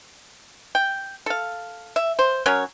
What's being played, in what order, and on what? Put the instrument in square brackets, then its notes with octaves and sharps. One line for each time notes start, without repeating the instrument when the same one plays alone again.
[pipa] G5
A4 F5
E5
C5
F#3 C#4 A#4 C#5